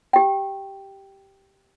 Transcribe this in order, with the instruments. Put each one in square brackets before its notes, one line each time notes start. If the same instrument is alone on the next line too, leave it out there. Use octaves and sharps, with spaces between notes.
[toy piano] G4 G5